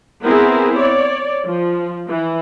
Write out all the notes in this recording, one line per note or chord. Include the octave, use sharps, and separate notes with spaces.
B3 C4 E4 G#4 A#4
C#5 D5
F3
E3